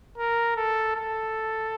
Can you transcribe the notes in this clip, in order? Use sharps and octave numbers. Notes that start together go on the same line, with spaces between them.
A#4
A4
A4